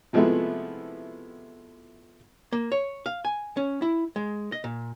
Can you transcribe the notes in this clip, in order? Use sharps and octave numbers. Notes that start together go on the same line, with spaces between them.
C3 F3 G#3 A3 B3 E4
A#3
C#5
F5
G#5
C#4
E4
G#3
D#5
A#2